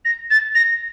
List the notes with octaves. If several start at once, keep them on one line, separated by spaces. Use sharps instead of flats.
A#6
A6
A#6